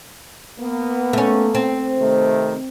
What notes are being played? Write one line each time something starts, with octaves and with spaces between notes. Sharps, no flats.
A#3 B3
A3 C#4
C4
C3 D#3 A3